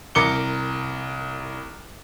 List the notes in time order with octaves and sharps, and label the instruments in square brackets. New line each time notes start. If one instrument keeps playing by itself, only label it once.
[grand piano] C2 A#4 D6 C#7 G7